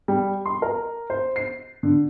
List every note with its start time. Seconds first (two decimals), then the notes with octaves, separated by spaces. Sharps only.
0.08 G3
0.46 C6
0.62 A#4
1.10 C5
1.36 C7
1.83 D3